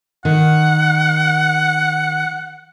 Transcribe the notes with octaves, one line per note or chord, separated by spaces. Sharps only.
D#3 F#5